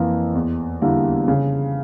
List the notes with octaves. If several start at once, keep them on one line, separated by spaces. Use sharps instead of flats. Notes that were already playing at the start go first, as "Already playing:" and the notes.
Already playing: F2 E3 A#3
E2
D3 G3 A#3 E4
C#3